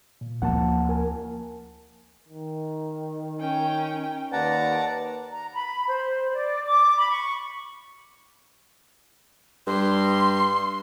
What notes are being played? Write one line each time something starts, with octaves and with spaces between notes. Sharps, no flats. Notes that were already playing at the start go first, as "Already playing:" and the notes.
A#2
D2 F3 A#3 F#5 A5
A#4 G#5 A5
D#3
C#4 G5
D#2 B4 D5 F#5 A5 A#5
A#5
B5
C5
D5
D6
B5
C#6
G2 C6